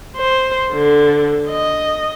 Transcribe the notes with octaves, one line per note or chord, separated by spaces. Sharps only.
C5
D3
D#5